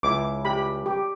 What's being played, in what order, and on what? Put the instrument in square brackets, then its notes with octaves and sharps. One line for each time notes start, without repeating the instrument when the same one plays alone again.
[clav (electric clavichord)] C#2 E4 [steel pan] D6
[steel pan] G4 B5
G4